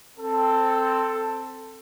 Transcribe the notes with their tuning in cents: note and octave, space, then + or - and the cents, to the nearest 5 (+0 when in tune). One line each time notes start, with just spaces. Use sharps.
C4 +0 A4 +10